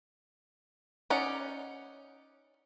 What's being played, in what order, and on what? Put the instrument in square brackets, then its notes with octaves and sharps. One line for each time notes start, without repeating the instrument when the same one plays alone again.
[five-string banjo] C#4 D#4 D5 F#5